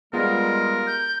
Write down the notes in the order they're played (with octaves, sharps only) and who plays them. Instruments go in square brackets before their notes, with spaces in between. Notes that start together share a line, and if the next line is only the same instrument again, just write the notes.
[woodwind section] G3 G#3 [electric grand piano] B3 F4 G#4 [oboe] A#4
[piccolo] G6